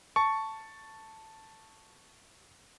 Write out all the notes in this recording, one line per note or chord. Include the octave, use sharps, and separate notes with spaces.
A5 C#6